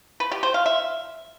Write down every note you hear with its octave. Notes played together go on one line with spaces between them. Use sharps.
B4
G4
C5
F5
E5